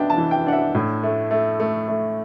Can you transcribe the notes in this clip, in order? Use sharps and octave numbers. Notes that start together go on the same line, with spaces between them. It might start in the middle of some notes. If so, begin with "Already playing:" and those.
Already playing: B3 D4 E5 G5
A5
E3
G5
D4 F#5
E5
A2
A3
A3
A3
A3